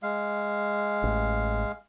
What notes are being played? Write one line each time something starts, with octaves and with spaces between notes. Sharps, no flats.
G#3 F5
A1